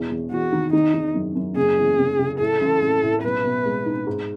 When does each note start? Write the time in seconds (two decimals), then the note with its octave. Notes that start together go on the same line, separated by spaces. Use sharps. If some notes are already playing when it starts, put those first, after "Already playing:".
Already playing: E1 E2
0.10 E2
0.32 E2 F#4
0.52 D#3
0.73 D#3 D#4
0.94 D#3
1.14 F#2
1.35 F#2
1.56 F#1 G#4
1.78 E2
1.99 C#3
2.19 C#3
2.39 A2 A4
2.61 A1
2.82 A1
3.03 A2
3.23 B1 B4
3.44 B2
3.65 G#3
3.86 D#4
4.06 G#2